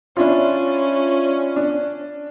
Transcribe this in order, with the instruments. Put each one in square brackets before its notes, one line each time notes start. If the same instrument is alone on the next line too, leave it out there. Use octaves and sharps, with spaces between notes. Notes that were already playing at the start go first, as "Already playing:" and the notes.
[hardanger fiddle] C#4 [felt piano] D4 E4 F4
[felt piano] D4